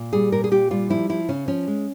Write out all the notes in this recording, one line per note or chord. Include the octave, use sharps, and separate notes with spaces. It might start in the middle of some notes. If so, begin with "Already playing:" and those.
Already playing: A#2
G3 G#4
A#2 A#4
G#4
A#2 G4
G3 F4
F3 E4
F3 E4
C#3 C#4
F3 C#4
G#3